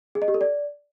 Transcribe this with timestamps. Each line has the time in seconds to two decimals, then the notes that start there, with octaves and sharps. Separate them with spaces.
0.15 G#4
0.22 D#5
0.28 G4
0.34 A4
0.41 D5